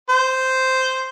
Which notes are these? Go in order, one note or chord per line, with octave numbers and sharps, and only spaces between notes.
C5